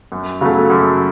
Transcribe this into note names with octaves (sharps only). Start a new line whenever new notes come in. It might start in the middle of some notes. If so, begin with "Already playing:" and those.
F#2
C#3 F#3 A3
F#2